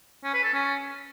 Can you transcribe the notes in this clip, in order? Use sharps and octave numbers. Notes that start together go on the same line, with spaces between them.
C#4
B4
A4
C#4